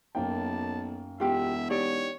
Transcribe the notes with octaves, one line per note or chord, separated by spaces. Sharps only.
B1 F#2 A#3 G5 A5
E1 F4 G4 E5
D#4 G4 C#5 D5